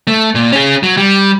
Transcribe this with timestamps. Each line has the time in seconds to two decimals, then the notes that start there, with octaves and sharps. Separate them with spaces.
0.07 A3
0.35 A#2
0.52 C#4 G#4
0.83 F#3
0.97 G3